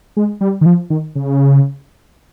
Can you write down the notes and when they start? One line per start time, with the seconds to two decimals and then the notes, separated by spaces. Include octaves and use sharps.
0.17 G#3
0.41 G3
0.61 D#3
0.66 F3
0.90 D#3
1.16 C#3